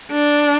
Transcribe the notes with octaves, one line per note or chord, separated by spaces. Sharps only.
D4